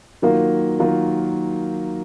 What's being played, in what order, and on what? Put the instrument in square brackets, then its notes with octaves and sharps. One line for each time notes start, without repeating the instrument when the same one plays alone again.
[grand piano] D#3 F#3 A#3 F4
D#3 F#3 A#3 F4